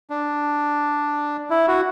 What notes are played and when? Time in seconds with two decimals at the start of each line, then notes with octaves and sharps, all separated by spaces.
0.10 D4
1.50 E4
1.68 F#4